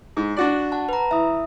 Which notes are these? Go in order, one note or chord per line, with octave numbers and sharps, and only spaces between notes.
G#2
D4 F#4 D5
F#5 A5
B4 A#5
E3 E5 D#6